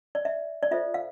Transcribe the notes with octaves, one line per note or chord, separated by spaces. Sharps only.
D5
E5
D5
F4 A4 C5 E5
F5